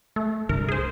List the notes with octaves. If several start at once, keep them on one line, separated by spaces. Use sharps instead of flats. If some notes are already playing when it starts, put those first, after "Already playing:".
A3
C2 G2 D3 A#4
G#4 C5